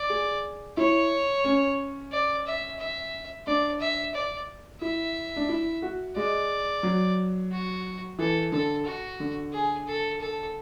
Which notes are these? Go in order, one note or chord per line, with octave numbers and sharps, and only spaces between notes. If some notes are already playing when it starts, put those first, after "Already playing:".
Already playing: D5
G#4
E4 C#5
C#4
D5
E5
E5
D4 D5
E5
D5
E4 E5
D4
E4
F#4
G#3 D5
F#3
F#4
E3 A4
D3 A4
F#4
D3
G#4
A4
A4